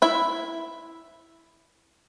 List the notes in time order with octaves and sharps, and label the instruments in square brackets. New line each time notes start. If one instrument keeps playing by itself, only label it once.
[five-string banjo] E4 E5 B5